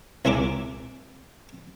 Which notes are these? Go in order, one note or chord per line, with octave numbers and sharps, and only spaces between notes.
C2 G#3 E4 A#4 D6